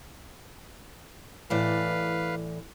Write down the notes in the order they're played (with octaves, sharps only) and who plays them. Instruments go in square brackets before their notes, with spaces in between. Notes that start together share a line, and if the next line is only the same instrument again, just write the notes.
[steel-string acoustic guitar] A2 E3 D5 [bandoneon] B4 F5